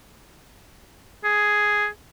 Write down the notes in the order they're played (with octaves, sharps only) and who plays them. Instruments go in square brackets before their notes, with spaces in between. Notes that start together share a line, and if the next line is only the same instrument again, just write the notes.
[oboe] G#4